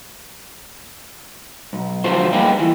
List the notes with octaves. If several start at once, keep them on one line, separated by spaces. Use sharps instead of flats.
B1
D3 F3 F#3 A3 F4 C5
G3 A#3 D#4 G4 G#4 B4
E3